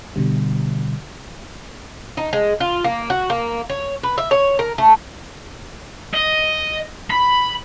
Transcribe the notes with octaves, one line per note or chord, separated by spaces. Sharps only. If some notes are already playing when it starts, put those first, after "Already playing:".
B2 D3 G3
D#4
G#3
F4
A#3
F#4
A#3
C#5
B4
E5
C#5
A#4
A3
D#5
B5